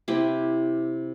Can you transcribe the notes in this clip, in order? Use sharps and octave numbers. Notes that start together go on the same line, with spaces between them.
C3 E4 G4